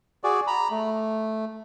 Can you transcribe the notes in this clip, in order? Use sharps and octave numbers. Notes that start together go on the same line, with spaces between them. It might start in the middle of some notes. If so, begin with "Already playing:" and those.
F#4 G#4 D5
A#5 B5
A3